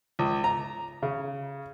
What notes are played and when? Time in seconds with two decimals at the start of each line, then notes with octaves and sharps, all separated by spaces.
0.19 C#2
0.44 A#5
1.03 C#3